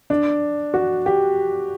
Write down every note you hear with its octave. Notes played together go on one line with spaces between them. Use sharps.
D4
F#4
G4